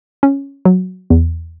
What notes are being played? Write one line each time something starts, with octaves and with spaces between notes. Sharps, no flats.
C#4
F#3
E2